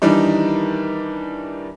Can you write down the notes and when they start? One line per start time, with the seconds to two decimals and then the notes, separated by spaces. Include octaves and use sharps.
0.02 D#3 E3 G3 D4 D#4